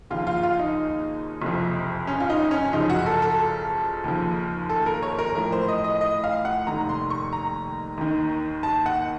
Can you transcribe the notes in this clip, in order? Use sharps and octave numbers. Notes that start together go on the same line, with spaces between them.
D#2 C#3 F3 F4
F4
F4
D#4
F#1 F2 C3 F3
C#4
F4
D#4
C#4
F#1 F#2 C#3 F3 D#4
F#4
A4
A4
D#2 C#3 F3
A4
A#4
C#5
A#4
A1 A2 F3 A#4
C5
D#5
D#5
D#5
F5
F#5
F1 D#2 D#3 A#5
C6
C#6
A#5
D#2 D#3
A5
F#5